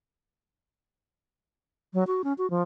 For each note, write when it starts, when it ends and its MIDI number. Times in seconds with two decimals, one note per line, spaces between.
1.94 2.04 54
2.07 2.22 66
2.24 2.33 61
2.38 2.49 66
2.50 2.62 53